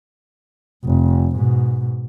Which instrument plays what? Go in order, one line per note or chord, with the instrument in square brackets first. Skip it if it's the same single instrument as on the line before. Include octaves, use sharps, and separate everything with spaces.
[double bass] F1
G#2 B2